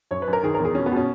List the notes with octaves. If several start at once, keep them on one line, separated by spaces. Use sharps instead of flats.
F#2 C#5
B4
F#2
A#4
D#3 G#4
E2 A#4
G#4
B2 C#4
B3
B2 C#4